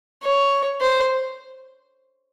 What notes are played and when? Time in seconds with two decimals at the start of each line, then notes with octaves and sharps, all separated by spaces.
0.23 C#5
0.81 C5